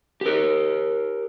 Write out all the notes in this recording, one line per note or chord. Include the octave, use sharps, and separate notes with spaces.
G4 A#4